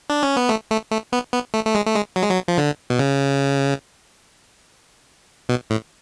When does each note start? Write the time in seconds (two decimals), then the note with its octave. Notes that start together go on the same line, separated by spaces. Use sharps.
0.10 D4
0.23 C#4
0.36 B3
0.49 A3
0.71 A3
0.91 A3
1.13 B3
1.33 B3
1.54 A3
1.65 A3
1.75 G#3
1.87 A3
1.95 G#3
2.16 F#3
2.23 G#3
2.30 F#3
2.48 F3
2.58 D3
2.90 B2
2.99 C#3
5.49 B2
5.70 A2